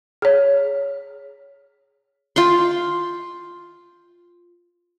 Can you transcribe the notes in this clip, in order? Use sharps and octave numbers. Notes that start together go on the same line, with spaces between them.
G#4 C#5
F4 G5 C6